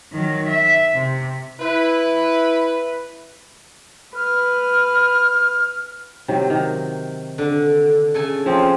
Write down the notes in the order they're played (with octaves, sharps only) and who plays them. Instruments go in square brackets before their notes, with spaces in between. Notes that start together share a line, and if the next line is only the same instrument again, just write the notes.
[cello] D#3 F#3
E5
C3
[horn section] E4 B4
[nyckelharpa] B4 [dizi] F6
[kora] C3 D#3 F#3
D#3
[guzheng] D3
C#3 A4 G#5
[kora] F3 C4 C#4